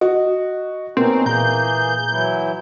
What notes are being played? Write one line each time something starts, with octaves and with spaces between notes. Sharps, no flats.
F#4 D#5
B2 A#3 C4 C#4 D#4
A#2 E3 A#3 G#4 A#5 G6
E3 F#3 E4